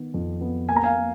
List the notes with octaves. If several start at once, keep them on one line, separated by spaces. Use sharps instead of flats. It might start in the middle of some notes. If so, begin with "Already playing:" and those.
Already playing: D#3 B3
F2
B3
A#3 G#5
A#5
F5 G#5
A#3